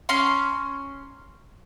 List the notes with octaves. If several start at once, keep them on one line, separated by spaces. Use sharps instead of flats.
C#4 A#5 C6